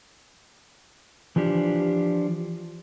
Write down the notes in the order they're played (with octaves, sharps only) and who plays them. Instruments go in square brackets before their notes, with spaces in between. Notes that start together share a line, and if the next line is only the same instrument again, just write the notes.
[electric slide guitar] E3 F3 D4 G4